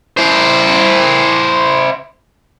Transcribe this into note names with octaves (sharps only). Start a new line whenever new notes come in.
E4 C5